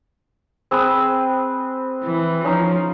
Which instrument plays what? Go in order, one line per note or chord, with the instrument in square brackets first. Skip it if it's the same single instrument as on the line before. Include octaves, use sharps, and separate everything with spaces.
[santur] C4 G#4 B4
[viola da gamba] E3
[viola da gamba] F3 [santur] C#4 D#4